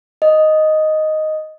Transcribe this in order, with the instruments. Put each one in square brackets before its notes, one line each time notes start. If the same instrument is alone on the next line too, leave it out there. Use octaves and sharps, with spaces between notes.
[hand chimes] D#5